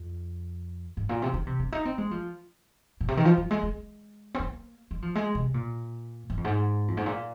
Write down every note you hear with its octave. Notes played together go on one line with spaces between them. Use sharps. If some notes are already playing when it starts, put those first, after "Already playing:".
Already playing: F2
G#2
A#2
C3
D#3
C3
C4
D#4
C4
G#3
F3
A#2
C3
D#3
F3
F3
G#3
G#3
C4
A#3
G#3
F3
G#3
C3
A#2
G#2
F2
G#2
F2
G#2
A#2